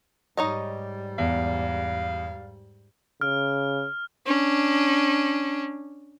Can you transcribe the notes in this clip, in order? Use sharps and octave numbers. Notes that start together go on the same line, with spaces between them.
G#2 G3 D#4 C#5 D#5
E2 F5
C#3 F6
C#4 D4